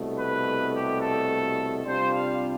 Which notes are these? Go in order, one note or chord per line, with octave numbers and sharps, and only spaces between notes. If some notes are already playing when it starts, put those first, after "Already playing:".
Already playing: C2 B2 A3
B4
G4
A4
C3 G3 D4 F4 C5
F5